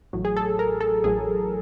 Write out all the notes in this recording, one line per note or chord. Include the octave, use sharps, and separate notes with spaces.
A1 A2 F#3
G#4
A4
A#4
A4
A1 A2 F#3 G#4